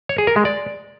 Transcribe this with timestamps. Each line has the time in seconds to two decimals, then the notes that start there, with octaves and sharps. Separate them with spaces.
0.09 C#5
0.18 G#4
0.27 A#4
0.36 G#3
0.45 D5